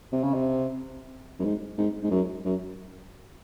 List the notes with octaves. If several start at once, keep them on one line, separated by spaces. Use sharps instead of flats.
C3
C#3
C3
F#2
G#2
G#2
G#2
F#2
F#2